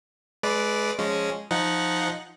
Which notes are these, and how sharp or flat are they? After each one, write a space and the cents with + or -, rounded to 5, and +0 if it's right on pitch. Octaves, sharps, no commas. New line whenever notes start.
G#3 +30 B4 +0 D5 -10
F3 +0 G#3 +0 C#4 +0
F3 +0 D#4 +0 F#5 +0